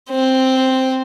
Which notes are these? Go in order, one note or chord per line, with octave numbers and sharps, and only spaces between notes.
C4